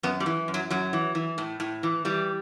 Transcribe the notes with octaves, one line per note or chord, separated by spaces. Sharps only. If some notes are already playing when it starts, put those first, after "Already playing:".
F#2 B3
G3
E3
F#2
F#3
F#2 F#3
E3
E3
A2
A2
E3
E3 G3